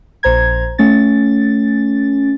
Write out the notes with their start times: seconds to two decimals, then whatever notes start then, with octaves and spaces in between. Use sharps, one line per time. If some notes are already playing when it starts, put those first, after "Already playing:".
0.23 A#1 C5 A#5 G#6
0.78 A3 C#4 A6